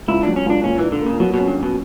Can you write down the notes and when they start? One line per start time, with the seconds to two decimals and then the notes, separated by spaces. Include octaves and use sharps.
0.08 C#2 E4
0.23 F#3 D4
0.36 C#4
0.46 C#2 D4
0.64 A#2 C#4
0.78 E3
0.84 D4
0.92 D3
1.02 C#3 A#3
1.20 B2 F#3
1.34 B2 C#4
1.48 G2
1.58 B2 C#4